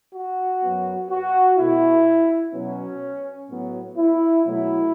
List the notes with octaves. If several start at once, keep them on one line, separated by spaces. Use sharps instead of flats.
F#4
F#2 F#3 B3
F#4
B2 A3 E4
B2 F#3 B3 C#4
A2 F#3 B3
E4
B2 F#3 A3 E4